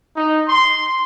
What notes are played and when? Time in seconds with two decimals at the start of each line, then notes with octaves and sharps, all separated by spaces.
0.16 D#4
0.48 C6